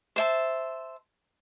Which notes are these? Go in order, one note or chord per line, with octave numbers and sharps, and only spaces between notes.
C5 E5 A5